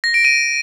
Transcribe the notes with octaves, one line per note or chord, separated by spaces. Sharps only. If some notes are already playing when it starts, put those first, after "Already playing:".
A#6
D7
D#7